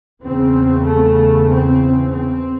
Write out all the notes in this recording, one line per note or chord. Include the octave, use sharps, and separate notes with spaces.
E2 C#3 C4
A3
C4
C4